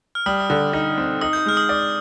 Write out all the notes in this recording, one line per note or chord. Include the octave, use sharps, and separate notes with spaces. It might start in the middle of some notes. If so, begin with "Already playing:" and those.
F6
G3 D#6
D3
D#4
C4
D#4 D#6
G6
G#3 F6
D#6
D5